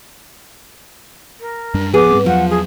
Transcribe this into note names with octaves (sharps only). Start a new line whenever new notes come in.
A#4
F#2 G3 D4
D1 F3 B3 G#4 D6
G#2 G3 C4
E2 F3 F#3 F#5
G#4